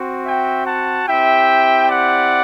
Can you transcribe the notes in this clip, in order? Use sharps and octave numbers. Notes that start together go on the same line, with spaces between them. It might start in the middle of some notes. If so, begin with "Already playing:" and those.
Already playing: C4 F#4
E5 G5
F#5 A5
C4 E4 G4 E5 G5
D5 F#5